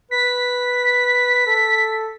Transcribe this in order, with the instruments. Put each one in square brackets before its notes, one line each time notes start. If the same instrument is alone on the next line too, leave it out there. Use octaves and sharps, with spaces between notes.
[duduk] B4 [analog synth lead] B6
[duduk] A4